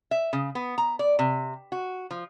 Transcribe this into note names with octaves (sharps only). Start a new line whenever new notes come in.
E5
C#3
B3
A#5
D5
C3
F#4
F3